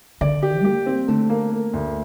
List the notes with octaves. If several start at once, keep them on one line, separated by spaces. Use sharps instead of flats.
D3 D5
G4
A#3 G4
C4
D3 A3
A#3
A#3
D2